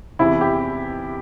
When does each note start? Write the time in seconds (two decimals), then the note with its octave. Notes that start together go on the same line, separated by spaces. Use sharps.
0.19 E2 C3 E3 E4
0.41 G4